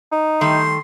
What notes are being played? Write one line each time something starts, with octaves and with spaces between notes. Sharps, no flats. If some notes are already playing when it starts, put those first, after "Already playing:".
D#4
D#3 G3 A3 C6